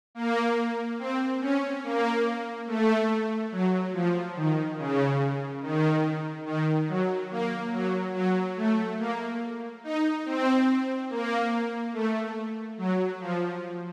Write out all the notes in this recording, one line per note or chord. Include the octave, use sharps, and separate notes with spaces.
A#3
C4
C#4
A#3
A3
F#3
F3
D#3
C#3
D#3
D#3
F#3
A#3
F#3
F#3
A3
A#3
D#4
C4
A#3
A3
F#3
F3